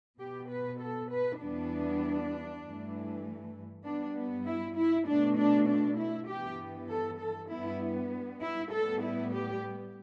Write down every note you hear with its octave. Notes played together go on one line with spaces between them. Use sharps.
B2 B3 G4
B4
A4
B4
E2 E3 G3 B3 D4
G2 E3 A3
G2 G3 B3 D4
B3
E4
E4
B2 A3 D4
D4
D4
E4
G2 E3 B3 G4
A4
A4
G2 G3 B3 E4
E4
A2 G3 B3 A4
E4
G4